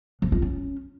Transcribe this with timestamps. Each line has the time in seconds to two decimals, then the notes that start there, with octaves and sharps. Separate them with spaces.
0.22 F3
0.32 F4
0.42 C#4